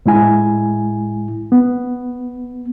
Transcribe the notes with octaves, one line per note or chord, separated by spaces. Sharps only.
A2 G#3 E4 G#5
B3